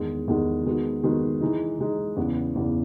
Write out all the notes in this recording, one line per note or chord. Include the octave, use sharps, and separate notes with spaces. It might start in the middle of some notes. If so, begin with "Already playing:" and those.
Already playing: E2 D#3 G#3
E2 D#3 G#3
D#3 G#3 B3 F#4
D#3 G#3 B3 F#4
E3 G#3 D#4
E3 G#3 D#4
E2 C#3 E3 B3
E2 C#3 E3 B3